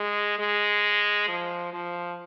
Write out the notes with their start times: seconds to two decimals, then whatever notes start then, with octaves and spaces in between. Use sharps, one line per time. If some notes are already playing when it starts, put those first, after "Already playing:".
Already playing: G#3
0.39 G#3
1.28 F3
1.73 F3